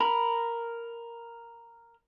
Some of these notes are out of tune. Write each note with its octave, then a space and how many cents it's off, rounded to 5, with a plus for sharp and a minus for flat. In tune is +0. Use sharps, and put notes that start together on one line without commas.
A#4 +0 B5 +0